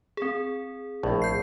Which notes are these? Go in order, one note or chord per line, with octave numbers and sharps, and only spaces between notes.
C4 G#4
A#1 A2
G6 C7